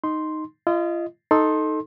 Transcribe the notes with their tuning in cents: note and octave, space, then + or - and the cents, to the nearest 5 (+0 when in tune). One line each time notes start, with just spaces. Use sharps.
D#4 +0 C6 +0
F4 -35 D#5 +0
D#4 +5 A4 +0 C6 +20